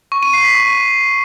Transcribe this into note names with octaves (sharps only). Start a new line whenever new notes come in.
C#6
D#7
C7
B6
C#6